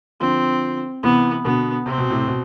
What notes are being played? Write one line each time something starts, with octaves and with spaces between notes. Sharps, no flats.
D3 F3 C4
C3 E3 B3
B2 D3 B3
C3 C4
B2
A2 C3
B2